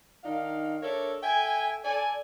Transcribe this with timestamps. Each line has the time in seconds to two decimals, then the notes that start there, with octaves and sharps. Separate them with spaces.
0.24 D#3 D4 D#4 F5
0.83 D4 A4 A#4 C#5 D5 E5
1.23 A4 E5 G5 G#5
1.85 A4 D5 G#5